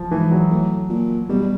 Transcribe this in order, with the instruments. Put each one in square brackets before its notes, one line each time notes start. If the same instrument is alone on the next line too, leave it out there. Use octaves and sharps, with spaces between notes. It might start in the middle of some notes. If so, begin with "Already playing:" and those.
Already playing: [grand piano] F3
[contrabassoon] G#2 [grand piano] E3
[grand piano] F#3
[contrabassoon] A2
A#2
[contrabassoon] B2 [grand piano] G3
[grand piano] G3